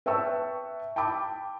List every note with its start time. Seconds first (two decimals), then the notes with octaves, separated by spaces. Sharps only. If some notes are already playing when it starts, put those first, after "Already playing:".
0.06 B4 E5 G5 A5 C#6 E6
0.96 G5 A5 B5 D6